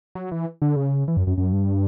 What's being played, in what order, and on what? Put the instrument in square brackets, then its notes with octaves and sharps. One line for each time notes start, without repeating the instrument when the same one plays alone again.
[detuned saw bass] F#3
E3
D3
C#3
E3
F#2
F#2
F#2
G2